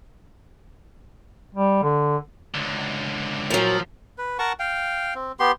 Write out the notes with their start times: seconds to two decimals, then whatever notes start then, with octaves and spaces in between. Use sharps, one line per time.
1.54 G3
1.83 D3
2.54 C#2 D3
3.50 A#2 F3 F#3
4.18 B4
4.39 A#4 F#5 A5 C#6
4.59 F5 G5
5.15 C4
5.39 B3 G4 C6